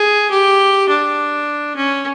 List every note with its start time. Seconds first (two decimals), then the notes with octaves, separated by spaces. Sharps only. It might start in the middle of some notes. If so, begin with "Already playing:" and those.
Already playing: G#4
0.31 G4
0.89 D4
1.76 C#4